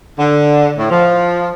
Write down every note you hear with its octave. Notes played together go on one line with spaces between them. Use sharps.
D3
A2
F3